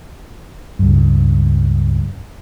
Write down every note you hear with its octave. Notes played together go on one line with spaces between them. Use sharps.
C#2 G2